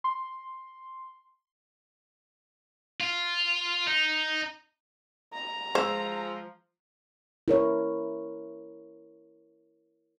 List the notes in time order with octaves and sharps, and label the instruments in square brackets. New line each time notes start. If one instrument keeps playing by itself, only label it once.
[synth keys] C6
[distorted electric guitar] F4
D#4
[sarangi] A#5
[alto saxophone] F3 [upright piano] G#3 F4 E6 [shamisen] C5
[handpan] E4 A#4 C#5